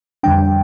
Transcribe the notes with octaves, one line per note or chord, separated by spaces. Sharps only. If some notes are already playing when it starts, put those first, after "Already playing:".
F2 D3 G3 D4 G5